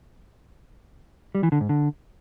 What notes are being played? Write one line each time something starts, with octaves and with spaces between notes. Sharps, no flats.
G3
E3
D3
G#2
D3